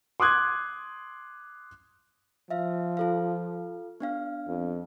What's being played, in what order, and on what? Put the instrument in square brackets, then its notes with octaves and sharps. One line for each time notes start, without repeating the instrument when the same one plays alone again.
[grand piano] C6 D6 D#6 F#6 G#6
[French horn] F3 [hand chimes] E5 F5
[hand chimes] F4 A4 F5
B3 D4 F5
[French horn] F2